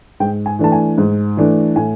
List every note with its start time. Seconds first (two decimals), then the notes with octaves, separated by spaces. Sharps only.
0.20 G#2 G5
0.46 G#5
0.59 E3 A3 D4 A5
0.72 G#5
0.98 G#2
1.37 E3 A3 D4
1.76 A2 G#5